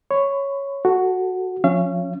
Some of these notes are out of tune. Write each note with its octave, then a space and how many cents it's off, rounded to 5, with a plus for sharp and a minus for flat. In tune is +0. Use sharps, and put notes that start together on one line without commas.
C#5 +0 B5 +35
F#4 +0 A4 +0
F3 +30 C#4 +0 F5 -40